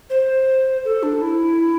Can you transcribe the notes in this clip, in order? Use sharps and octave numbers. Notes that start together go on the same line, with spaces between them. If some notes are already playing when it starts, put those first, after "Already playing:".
C5
A4
D4
E4